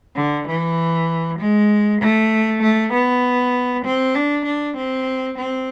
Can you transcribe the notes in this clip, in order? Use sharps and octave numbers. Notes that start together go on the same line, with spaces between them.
D3
E3
G#3
A3
A3
B3
C4
D4
D4
C4
C4